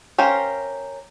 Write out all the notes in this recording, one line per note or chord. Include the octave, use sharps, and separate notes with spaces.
C#4 G4 A#4 C5 F5